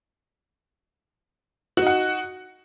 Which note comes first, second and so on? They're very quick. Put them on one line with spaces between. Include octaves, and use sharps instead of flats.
F#4 D#4 F#5